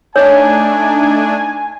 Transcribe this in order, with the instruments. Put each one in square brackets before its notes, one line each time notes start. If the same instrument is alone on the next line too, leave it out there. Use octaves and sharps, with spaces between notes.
[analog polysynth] A3 D4 D#4 [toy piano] C#5 [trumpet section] G#5